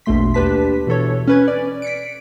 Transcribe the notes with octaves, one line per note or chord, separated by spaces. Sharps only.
A#1 E2 B2 A3 C6 B6
D#2 D4 G4 B4 A5 B6
B2 E3 A4 C#5
C#4 B4 G#6
D5
B6 C#7 D7